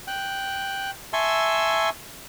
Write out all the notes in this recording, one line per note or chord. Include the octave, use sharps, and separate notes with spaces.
G5 F#6
E5 G#5 A5 C6 C#6 E6